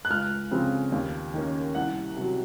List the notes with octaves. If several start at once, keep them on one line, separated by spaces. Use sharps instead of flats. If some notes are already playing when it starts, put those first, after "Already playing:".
F#6
C#2 F6
C#3 F3 C4
D#2
D#3 A#3 C#4
C2 F#5
C3 F#3